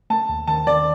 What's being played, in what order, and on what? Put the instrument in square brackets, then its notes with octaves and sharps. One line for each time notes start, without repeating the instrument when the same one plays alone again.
[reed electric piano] A3 [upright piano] A5
[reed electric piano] D#2
[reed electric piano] D#3 [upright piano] A5
[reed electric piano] D#3 [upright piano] D5